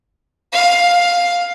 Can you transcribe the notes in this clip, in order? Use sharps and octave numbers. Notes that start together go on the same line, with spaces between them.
F5